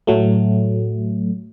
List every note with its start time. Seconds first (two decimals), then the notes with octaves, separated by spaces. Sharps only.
0.07 A2 F#3 A3